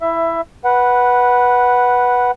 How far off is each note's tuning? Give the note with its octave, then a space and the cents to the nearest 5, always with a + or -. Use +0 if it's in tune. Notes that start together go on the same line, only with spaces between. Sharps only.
E4 +0 E5 +15
B4 -10 F#5 +5